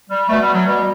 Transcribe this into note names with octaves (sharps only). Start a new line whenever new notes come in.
G3
B2 A3
G3
F#3
B2 G3